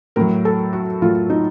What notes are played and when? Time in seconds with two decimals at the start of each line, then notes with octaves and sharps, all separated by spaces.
0.16 A2 F#3 A#4
0.45 A4
0.73 F#4
1.02 A2 F#3 F4
1.30 D#4